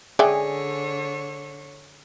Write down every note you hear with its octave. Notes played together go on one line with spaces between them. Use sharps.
D3 G#4 C#5 D5 E5 G5